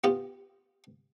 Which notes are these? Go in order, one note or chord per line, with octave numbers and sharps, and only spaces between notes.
B3 F4 G4